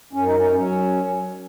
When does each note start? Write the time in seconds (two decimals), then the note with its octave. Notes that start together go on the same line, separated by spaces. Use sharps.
0.13 F#2 C#4
0.25 D#4
0.37 C#4
0.56 F#3 C#4